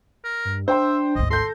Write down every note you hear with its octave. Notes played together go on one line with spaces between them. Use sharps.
A#4
G2
D4 C5 E5 G5 C6
G#1 D2 D#5
A4 C6 G6 A#6